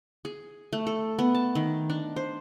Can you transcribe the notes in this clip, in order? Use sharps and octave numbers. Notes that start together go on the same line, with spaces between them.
G#4
A3
A4
B3
A5
D#3
D4
C5